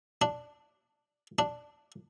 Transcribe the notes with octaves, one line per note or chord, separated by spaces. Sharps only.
D4
D4